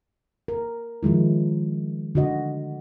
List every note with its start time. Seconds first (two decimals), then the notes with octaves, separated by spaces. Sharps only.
0.48 A#4
1.03 D#3 F3 G#3 E4
2.15 D3 F#4 D#5